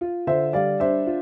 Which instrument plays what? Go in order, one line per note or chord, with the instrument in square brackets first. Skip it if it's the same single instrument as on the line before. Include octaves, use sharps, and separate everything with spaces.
[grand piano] F4
[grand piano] D3 [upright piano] C5 E5
[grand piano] G3 [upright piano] D5 F5
[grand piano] D4 [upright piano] C5 E5
[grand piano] F4